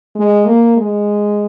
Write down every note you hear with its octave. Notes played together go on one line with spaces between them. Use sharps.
G#3
A#3
G#3